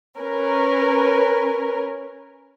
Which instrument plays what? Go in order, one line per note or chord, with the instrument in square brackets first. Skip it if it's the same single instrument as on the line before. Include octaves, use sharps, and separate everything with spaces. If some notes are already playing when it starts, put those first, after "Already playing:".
[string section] C#4 A#4 B4